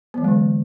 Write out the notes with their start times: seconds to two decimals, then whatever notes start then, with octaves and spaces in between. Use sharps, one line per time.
0.14 B3
0.18 E3
0.21 F#3
0.24 G#3
0.28 D3